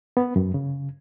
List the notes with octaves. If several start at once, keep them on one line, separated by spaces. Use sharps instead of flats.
B3
F#2
C#3